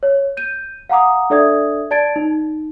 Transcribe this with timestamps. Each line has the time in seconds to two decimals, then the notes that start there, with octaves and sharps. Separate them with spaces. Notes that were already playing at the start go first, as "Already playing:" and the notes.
0.03 C#5
0.37 G6 D#7
0.90 F5 F#5 A#5 D6 D#6
1.30 D4 A4 D5 E5 D#6 G#6
1.91 D5 A5 G#6 A6 D7
2.16 D#4